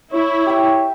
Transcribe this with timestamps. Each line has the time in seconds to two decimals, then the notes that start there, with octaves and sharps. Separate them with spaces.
0.13 E4 C#5
0.46 G4 E5